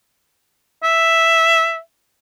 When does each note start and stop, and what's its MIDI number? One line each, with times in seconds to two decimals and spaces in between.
0.84 1.79 76